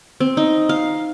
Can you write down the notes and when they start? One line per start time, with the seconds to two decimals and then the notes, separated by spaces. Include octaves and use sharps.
0.20 C4
0.37 D#4
0.69 F5